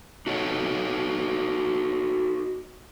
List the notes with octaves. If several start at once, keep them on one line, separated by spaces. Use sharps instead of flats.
D#4 F#4 A4 C#5 D#5